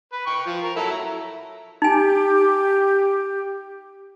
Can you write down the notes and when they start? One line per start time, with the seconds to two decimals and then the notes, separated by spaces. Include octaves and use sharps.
0.13 B4
0.27 G5 C#6
0.46 F3
0.63 A#4
0.76 F#3 E4 A4
0.91 A#5
1.82 D#4 G4 G#5